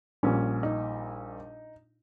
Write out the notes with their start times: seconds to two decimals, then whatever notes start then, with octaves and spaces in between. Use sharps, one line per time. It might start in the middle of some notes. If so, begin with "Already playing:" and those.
0.23 A#1 A#2 G3 C#4
0.63 D#4